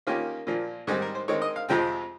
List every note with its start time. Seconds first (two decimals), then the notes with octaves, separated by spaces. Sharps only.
0.07 D#3 A#3 C#4 F4 G4
0.47 A#2 F3 A#3
0.87 G#2 D#3 G3 C4 D#4 G#4
1.02 A#4
1.15 C5
1.28 D#3 G#3 C4 D#4 C#5
1.42 D#5
1.56 F5
1.69 F2 C3 F3 G#3 C4 G5